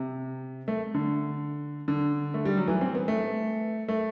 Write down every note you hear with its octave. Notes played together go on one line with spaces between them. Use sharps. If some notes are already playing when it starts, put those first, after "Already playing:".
Already playing: C3
A3
D3
D3
A3
G3
F#3
E3
C4
B3
A3
A3